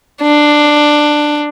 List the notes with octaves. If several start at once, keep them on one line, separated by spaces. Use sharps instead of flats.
D4